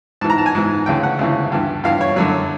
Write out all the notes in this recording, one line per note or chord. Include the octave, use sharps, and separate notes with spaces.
G#2 E3 A5
A#5
A5
G#5
G#2 E3
D2 C#3 E3 G5
F#5
D2 C#3 E3
G2 E3
G2 E3 F5
C#5
F#2 D3 F#3